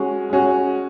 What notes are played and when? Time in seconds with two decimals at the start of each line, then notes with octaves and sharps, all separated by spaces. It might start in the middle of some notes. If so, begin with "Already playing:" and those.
Already playing: G#3 C#4 F#4
0.30 G#3 C#4 F#4